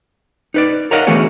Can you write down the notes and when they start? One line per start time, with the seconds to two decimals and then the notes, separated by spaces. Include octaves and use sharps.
0.54 D#4 B4 D5
0.91 A#4 C#5 D#5 F5 F#5
1.07 D3 E3 A3 B3 F#4 G#4